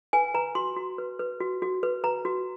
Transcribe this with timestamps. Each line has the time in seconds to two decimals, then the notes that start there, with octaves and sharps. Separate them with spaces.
0.13 B4 G#5
0.34 B4 A#5
0.55 F#4 C6
0.77 F#4
0.98 B4
1.20 B4
1.40 F#4
1.62 F#4
1.83 B4
2.04 B4 A#5
2.25 F#4